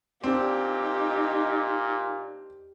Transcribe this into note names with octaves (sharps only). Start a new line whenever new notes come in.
A#2 C4 D4 D#4 G4